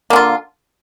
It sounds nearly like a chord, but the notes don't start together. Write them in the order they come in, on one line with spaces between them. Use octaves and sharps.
A#3 D3 F4